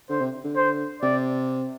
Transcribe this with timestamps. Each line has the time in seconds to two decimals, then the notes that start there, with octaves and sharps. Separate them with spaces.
0.09 D3 C5
0.21 C3
0.44 D3
0.56 C5
1.02 C3 D5